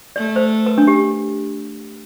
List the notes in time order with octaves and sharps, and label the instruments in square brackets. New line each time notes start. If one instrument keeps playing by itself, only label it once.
[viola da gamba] A3 [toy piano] D5
[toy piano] C5
B4
D4
G4